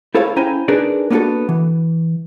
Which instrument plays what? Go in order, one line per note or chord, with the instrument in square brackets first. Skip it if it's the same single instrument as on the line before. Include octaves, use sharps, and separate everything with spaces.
[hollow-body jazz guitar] E4 G#4 A4 C5 C#5 F5
C#4 E4 C5 G5 G#5 A#5
D4 D#4 G#4 A#4 B4 D5
A#3 B3 D4 F4 F#4 A4
E3